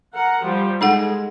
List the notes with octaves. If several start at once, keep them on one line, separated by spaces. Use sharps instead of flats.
A#4 F#5
F3 G3
G#3 D#4 A4 F#5